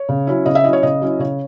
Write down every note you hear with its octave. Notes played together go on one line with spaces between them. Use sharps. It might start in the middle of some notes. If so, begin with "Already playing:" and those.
Already playing: C#5
C#3
F#3 C#4 E4
C#3 D#5
E5
F#3 C#4 E4 D#5
C#5
C#3 D#5
F#3 C#4 E4
C#3 C#5